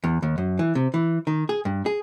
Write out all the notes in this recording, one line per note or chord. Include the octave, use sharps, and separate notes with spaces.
E2
D#2
F#2
E3
C3
E3
D#3
G#4
G2
G#4